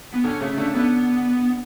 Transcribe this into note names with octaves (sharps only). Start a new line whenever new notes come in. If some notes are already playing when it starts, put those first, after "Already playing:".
B3
D3 C#4
C#3 A3
D3 A3
D3 B3